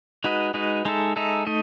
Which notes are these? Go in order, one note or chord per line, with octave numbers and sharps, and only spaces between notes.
G#3 D#4 F#4 B4 D#5
G#3 D#4 F#4 B4 D#5
G#3 D#4 A4 E5
G#3 D#4 A4 E5
A3 D#4 D#5